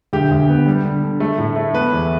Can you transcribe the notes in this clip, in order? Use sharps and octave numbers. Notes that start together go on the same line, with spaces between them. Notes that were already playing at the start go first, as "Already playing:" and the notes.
D2 G4
D2
B3
G3
D3
D3
A3
A2
A3
B3 B4
E2